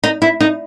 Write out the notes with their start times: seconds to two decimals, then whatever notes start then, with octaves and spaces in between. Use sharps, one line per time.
0.04 D#4
0.22 E4
0.40 D#4